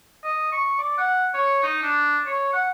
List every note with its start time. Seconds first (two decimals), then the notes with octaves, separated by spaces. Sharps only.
0.24 D#5
0.52 C#6
0.79 D5
0.98 F#5
1.34 C#5
1.63 D#4
1.83 D4
2.26 C#5
2.53 F#5